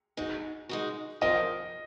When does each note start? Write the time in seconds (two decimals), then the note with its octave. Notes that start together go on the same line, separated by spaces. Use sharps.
0.17 G#3 D#4 F#4
0.69 G#3 D#4 F#4
1.21 F3 C4 F4 A#4 D#5